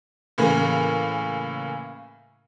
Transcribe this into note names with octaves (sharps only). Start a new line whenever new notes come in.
A2 C#3 E3 A#3